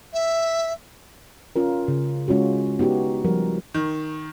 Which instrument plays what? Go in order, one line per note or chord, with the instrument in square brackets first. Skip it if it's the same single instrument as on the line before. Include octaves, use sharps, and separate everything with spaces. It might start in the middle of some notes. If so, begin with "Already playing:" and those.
[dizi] E5
[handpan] C#4 F4 A#4
C#3
G#3 C#4 F4 F#4
B3 D#4 F#4 G4
F3 G3 A#4
[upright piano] D#3